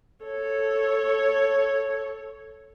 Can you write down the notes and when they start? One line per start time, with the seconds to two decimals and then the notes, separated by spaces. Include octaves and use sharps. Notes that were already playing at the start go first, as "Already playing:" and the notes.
0.25 A4 C#5